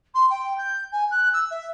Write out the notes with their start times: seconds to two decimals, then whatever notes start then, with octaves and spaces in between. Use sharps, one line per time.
0.14 C6
0.30 G5
0.57 G6
0.91 G#5
1.10 F#6
1.33 E6
1.50 E5